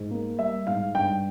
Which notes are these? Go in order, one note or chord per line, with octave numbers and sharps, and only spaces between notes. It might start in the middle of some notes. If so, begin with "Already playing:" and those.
Already playing: G#2
A#3
G3 E5
G#2 F5
G2 G5